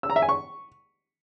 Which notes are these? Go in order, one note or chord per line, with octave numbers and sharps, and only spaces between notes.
E6
A#5
E5
G#5
C#6